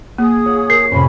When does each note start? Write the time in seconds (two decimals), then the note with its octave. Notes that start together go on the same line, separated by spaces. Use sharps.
0.18 A#3 G#4 D#6
0.45 F4 C#5 F#5
0.70 A#4 C7
0.91 F2 A2 C3 C#4 B5